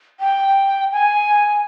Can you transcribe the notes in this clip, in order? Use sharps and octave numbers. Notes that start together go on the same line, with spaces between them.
G5
G#5